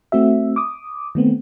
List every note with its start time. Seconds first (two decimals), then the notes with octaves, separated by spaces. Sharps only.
0.12 A3 C4 F#4 E5
0.56 D6 D#6
1.15 D#3 A3 B3 C4